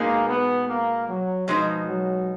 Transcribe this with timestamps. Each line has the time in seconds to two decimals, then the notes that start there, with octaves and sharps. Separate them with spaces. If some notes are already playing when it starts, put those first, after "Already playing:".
Already playing: B2 G#3 A#3 D#4 G#4
0.28 B3
0.67 A#3
1.07 F#3
1.48 B2 F3 G#3 D#4
1.88 F#3